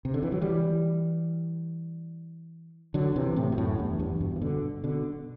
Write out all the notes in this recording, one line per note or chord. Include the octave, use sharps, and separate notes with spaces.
C3
D3
E3
F#3
E3 G3
D3 F#3
C3 E3
A2 C3
B2
F#2 A2
E2 G2
E2 G2
G2 B2
E3
B2 D3
B2 D3